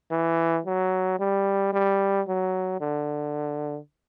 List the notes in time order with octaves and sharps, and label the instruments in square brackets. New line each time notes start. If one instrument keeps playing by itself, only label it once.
[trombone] E3
F#3
G3
G3
F#3
D3